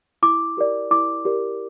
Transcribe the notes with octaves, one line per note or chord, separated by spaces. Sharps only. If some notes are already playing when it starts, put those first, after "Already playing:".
E4 D6
G4 A#4 D5
E4 D6
G4 A#4 D5